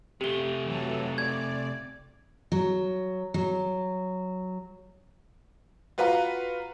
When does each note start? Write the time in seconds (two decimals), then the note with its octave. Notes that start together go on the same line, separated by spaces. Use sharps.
0.21 C3 A3 G4 G7
0.65 E3 F#3 A4
1.18 D5 G#6
2.52 F#3
3.34 F#3
5.98 F4 F#4 B4 F5 F#5 A#5